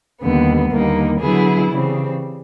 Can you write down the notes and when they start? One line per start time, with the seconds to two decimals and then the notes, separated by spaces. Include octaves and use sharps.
0.20 D#2 D3 G3 B3
0.70 D#2 D3 G3 A#3 D#4
1.19 D3 F#3 B3 E4 G#4
1.70 C#3 E3 G3 C4